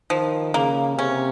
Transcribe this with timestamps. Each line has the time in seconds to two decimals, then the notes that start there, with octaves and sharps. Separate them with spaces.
0.10 D#3 F3
0.54 C#3 A#3
0.98 C3 C#4